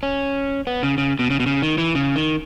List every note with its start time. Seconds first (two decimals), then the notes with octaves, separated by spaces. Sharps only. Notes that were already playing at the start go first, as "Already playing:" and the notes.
0.03 C#4
0.67 B3
0.83 C#3
0.98 C#3
1.19 B2
1.30 C#3
1.40 B2
1.46 C#3
1.62 D#3
1.78 E3
1.95 C#3
2.16 D#3